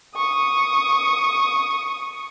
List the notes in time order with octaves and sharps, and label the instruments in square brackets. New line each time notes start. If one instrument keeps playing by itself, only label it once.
[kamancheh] C#6 D#6